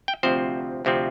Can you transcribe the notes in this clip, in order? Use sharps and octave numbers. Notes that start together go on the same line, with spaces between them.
G5
D2 C3 F3 C4 C5
D2 C3 F3 C4